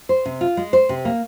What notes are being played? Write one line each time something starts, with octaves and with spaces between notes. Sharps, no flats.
C5
C3
F4
G#3
C5
C3
A#3